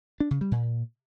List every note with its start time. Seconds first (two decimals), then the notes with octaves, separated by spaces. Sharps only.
0.20 D4
0.31 C#3
0.41 G3
0.51 A#2